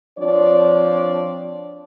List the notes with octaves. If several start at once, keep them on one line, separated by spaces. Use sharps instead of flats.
F3 C4 D4 C#5 D5